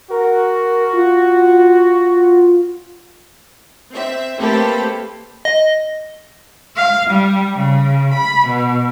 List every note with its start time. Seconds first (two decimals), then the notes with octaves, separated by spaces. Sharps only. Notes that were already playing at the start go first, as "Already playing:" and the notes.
0.10 F#4 A#4
0.93 F4
3.92 C4 E5
4.36 A3 A#3 C4 G4 A4 B4
5.45 D#5
6.77 F5
7.10 G3
7.58 C#3
8.13 B5
8.49 B2